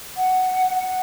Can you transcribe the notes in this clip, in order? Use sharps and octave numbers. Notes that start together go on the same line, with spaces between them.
F#5
F#5